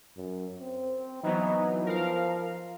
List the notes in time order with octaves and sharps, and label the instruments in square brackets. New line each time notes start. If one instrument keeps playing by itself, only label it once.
[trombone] F#2
C4
[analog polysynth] E3 F#3 B3 [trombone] D#4
[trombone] F3 [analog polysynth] A#4 F5